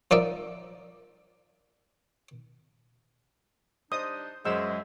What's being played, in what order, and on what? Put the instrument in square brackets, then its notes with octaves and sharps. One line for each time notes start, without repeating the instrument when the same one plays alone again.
[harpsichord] F3 D#4 A#4 D5 E5
[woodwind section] G3 D4 D#4 [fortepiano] C5 D#5 [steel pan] D#6
[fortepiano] F#2 C5 [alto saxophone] G#3 [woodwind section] F#4 G#4 E5 [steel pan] E6